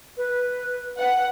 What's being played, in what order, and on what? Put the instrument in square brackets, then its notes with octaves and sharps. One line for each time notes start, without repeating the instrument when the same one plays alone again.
[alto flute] B4
[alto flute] B4 [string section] F#5